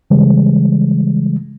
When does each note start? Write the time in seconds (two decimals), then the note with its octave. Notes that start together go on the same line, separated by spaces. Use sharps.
0.10 C#3 E3 G3 G#3